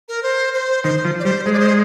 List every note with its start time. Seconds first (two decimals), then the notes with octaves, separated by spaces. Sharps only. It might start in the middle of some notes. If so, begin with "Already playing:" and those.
0.08 A#4
0.23 C5
0.54 C5
0.84 D#3 C5
1.05 F3
1.20 D5
1.25 G3 C5
1.45 G#3 C5
1.53 D5
1.59 C5